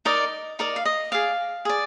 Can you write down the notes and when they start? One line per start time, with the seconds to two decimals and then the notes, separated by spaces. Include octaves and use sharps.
0.05 D#4 A#4 D5 D#5
0.59 D#4 A#4 D5
0.76 F5
0.85 D#5
1.12 G#4 D5 F5
1.65 G#4 D5